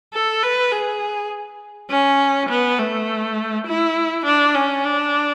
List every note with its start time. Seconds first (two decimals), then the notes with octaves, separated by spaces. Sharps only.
0.13 A4
0.43 B4
0.72 G#4
1.90 C#4
2.49 B3
2.79 A3
3.67 E4
4.26 D4
4.55 C#4
4.85 D4